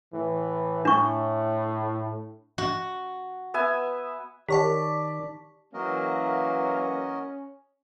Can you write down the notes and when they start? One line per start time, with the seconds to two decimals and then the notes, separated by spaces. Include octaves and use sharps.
0.13 A2 E3
0.85 A2 D4 C#6
2.58 F#4
3.54 B3 E5 G#5
4.49 D#3 G4 C#5 D5 A5 C#6 B6
5.74 E3 F#3 A#3 C#4 F#4 A#4 D#5